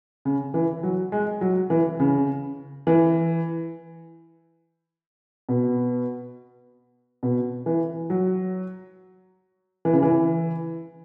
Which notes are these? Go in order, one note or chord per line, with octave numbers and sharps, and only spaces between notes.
C#3
E3
F#3
G#3
F#3
E3
C#3
E3
B2
B2
E3
F#3
E3
C#3
E3